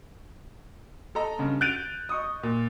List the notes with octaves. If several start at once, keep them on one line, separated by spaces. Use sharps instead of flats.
A4 D#5 A#5
G2 C#3
F#6 G6 A6 D7 D#7 F7
D#5 C#6 D#6
A#2